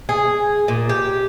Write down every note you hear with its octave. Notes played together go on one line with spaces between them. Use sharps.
G#4
A#2
G4